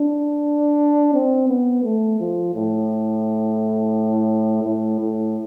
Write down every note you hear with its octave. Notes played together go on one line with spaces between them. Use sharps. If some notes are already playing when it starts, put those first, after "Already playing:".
Already playing: D4
C4
B3
A3
F3
A2
A2
A2